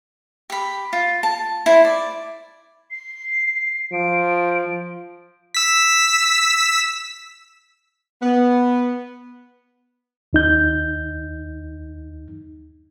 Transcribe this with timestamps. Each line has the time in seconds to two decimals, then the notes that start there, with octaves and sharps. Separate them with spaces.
0.50 G4 B5
0.93 F4
1.23 A5
1.66 E4 C5
1.85 D5
2.90 C7
3.92 F3 D7
5.55 E6 B6
8.22 B3
10.33 D#2 D#4 G6